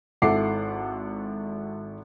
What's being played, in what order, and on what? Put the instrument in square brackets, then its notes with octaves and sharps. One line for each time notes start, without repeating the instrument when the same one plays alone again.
[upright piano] G#1 E4 A4 F#5 D6 C7